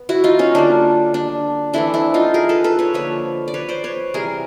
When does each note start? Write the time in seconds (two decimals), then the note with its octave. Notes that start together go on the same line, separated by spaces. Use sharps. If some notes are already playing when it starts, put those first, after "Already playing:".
Already playing: B3
0.09 E4 F#4
0.24 D#4 F4
0.39 C#4 D#4
0.55 D3 G3 A#3 D4
1.14 D4
1.73 E3 A3 C4 D4 E4
1.94 D4 E4
2.14 D#4 F4
2.34 G#4 A#4
2.49 A4 B4
2.64 A4 B4
2.79 B4 C#5
2.94 D3 F3 A#3 B4 C#5
3.48 D5
3.54 B4 C#5
3.69 C5 D5
3.84 B4 C#5
4.14 C3 E3 G3 G#4 A#4